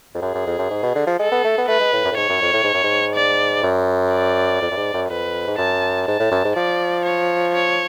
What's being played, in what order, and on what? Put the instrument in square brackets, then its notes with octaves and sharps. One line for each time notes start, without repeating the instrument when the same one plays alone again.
[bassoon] F2
[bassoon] F#2 [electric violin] G#4
[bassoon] F#2
F2
F#2
G#2
B2
D3
F3
[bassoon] G#3 [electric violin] A4
[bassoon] B3
A3
B3
[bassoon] A3 [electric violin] B4
[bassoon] G#3
A2
F#2
A2
[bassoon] G#2 [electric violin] C#5
[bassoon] F#2
F2
A2
G#2
F#2
G#2
[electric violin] D5
[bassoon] F#2
[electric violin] D5
[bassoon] F2
F#2
G#2
F#2
[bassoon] F2 [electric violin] B4
[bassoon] G#2
[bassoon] F#2 [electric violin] A5
[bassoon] G#2 [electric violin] A5
[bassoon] A2
F#2
G#2
[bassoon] F3 [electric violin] D5
[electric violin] C#5
C#5